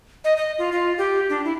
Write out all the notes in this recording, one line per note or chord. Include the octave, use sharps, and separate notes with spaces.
D#5
D#5
F4
F4
G4
D4
E4